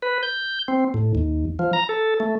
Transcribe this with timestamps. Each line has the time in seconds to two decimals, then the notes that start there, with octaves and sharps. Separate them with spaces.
0.02 B4
0.23 G6
0.68 C4
0.94 A2
1.15 D#2
1.59 F3
1.73 A#5
1.89 A4
2.20 A3